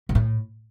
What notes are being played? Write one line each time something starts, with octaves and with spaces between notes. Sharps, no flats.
G#2
A2